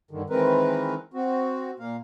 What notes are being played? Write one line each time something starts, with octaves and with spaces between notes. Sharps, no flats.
G2 D3 D#3
D#3 E3 G#3 C4 A#4 B4
C4 F#4
A#2 A#3 F5